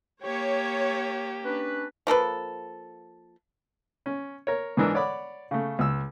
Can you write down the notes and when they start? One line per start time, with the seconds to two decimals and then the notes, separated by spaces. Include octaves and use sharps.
0.24 A#3 G4 C#5
1.44 C#4 D4 B4
2.07 F3 A#3 A4 B4
4.06 C#4
4.47 A#4 C#5
4.77 G#2 E3 D4 A#4 E6
4.94 C#5 D5 F#5 B5 D6
5.51 C#3 A3
5.79 C#2 E6